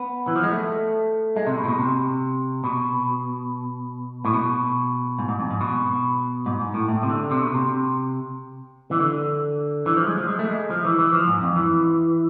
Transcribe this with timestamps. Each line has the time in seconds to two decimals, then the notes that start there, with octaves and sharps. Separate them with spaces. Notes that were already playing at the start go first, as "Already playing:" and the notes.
Already playing: B3
0.28 E3
0.36 F3
0.43 G#3
0.51 A3
1.37 G#3
1.47 C3
1.58 B2
1.64 A2
1.68 B2
1.79 C3
2.64 B2
4.25 A2
4.34 B2
5.19 G#2
5.29 G#2
5.40 F2
5.51 G#2
5.61 B2
6.46 G#2
6.60 G#2
6.74 A2
6.89 A2
7.03 C3
7.10 D3
7.31 C3
7.42 B2
7.54 C3
8.91 E3
9.00 D3
9.86 E3
9.96 F3
10.07 G#3
10.17 F3
10.29 G#3
10.39 A3
10.49 G#3
10.70 F3
10.85 E3
10.99 E3
11.13 F3
11.28 G#2
11.41 F2
11.56 E3